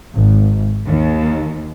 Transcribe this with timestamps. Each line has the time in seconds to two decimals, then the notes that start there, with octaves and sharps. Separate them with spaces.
0.13 G#1
0.88 D#2